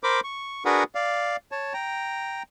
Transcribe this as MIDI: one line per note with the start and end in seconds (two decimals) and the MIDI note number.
0.03 0.20 70
0.03 0.20 72
0.03 0.20 83
0.03 0.20 86
0.24 0.63 85
0.65 0.84 62
0.65 0.84 66
0.65 0.84 68
0.65 0.84 70
0.65 0.84 71
0.65 0.84 78
0.95 1.36 74
0.95 1.36 77
1.52 1.73 73
1.52 1.73 81
1.74 2.43 79
1.74 2.43 82